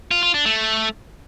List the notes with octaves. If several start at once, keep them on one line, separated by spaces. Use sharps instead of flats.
F4
F4
D4
A3